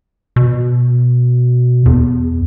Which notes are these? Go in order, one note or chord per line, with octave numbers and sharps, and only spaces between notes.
B2
E2